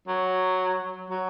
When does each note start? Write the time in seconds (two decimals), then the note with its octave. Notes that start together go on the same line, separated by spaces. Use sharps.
0.08 F#3
1.10 F#3